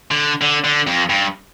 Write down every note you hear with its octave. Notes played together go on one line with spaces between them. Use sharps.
D3
D3
D3
F2
G2